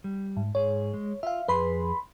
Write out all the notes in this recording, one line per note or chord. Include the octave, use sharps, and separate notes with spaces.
G3
G#2
G#2 G#4 C#5
G#3
F4 E5 F5
F2 G#4 B4 B5 C6